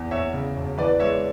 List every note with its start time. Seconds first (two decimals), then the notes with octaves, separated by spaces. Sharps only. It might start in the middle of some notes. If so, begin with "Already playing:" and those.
Already playing: E2
0.11 E2 C#5 E5
0.33 C#3
0.57 E1
0.78 E3 B4 D5
0.99 G#3 C#5 E5